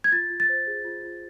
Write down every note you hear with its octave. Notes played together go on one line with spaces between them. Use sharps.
G#6
F4 A6
F4
A6
C5
G#4
F4
F4